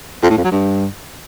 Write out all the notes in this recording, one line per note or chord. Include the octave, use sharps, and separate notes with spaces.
F2
A2
F2
F#3
G2